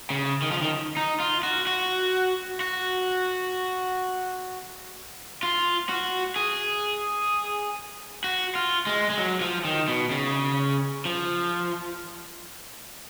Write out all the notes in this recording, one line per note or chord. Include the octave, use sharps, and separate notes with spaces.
C#3
D#3
F3
D#3
D#4
F4
F#4
F#4
F#4
F4
F#4
G#4
F#4
F4
G#3
G#3
F#3
F3
D#3
B2
C#3
F3